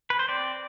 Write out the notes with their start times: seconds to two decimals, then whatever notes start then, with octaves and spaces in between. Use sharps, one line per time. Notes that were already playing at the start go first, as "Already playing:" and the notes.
0.10 B4
0.19 C5
0.28 C4 D5